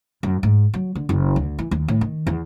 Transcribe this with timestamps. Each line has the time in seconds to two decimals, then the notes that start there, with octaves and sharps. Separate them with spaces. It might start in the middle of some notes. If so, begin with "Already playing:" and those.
0.23 F#2
0.43 G#2
0.74 F#3
0.95 D3
1.09 F#1
1.36 D2
1.59 E3
1.71 D#2
1.88 A2
2.01 D#3
2.27 E2